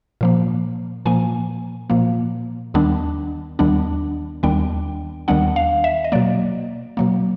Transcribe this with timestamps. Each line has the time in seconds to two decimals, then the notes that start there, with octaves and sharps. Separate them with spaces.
0.21 A#2 F3 A#3
1.06 A#2 F3 A#3 G#5
1.90 A#2 F3 A#3
2.74 D#2 D#3 G3 B3 D4
3.59 D#2 D#3 G3 B3 D4
4.43 D#2 D#3 G3 B3 D4 G5
5.28 D#2 D#3 G3 B3 D4 F#5
5.56 F5
5.84 E5
6.04 D#5
6.12 B2 F#3 A#3 D5
6.97 B2 F#3 A#3